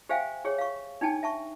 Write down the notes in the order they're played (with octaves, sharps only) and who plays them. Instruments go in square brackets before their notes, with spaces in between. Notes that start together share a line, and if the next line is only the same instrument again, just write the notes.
[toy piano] G4 C5 E5 F5 G5 G#5
G4 G#4 C#5
F5 C#6
D4 D#4 G5 A5
E5 A5 C#6